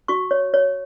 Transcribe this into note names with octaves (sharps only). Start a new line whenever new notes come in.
F#4 C#6
C#5
C#5